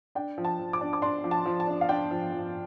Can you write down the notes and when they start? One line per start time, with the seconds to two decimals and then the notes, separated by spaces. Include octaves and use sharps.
0.15 D4 G5
0.38 F3
0.45 A5
0.59 F3
0.73 D6
0.81 D4
0.93 D6
1.02 D4 C6
1.24 F3
1.31 A5
1.45 F3
1.60 A5
1.67 D4
1.81 F5
1.89 D4 G5
2.11 F3
2.32 F3